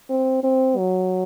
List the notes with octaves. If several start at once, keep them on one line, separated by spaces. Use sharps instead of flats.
C4
C4
F#3